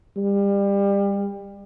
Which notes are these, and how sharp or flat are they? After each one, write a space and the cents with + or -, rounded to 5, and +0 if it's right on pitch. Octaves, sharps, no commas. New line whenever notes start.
G3 +30